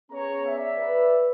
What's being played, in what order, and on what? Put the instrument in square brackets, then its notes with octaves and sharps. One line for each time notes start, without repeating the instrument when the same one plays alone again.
[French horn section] B3 C#4 G#4 [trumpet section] C#5 A#5
[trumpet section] D5 E5
[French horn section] B4